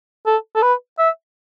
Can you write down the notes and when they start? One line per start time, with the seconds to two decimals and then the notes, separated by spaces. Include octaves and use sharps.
0.26 A4
0.55 A4
0.62 B4
0.98 E5